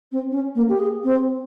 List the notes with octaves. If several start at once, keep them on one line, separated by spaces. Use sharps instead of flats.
C4
C#4
A#3
G4
G#4
C4